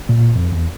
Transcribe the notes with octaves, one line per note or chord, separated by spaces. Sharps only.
A#2
F2
E2